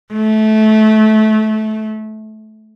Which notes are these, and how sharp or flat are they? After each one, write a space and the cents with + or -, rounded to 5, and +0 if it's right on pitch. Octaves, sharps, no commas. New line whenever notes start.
A3 -20